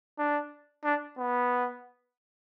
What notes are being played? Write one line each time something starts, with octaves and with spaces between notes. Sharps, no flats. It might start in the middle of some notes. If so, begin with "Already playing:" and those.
D4
D4
B3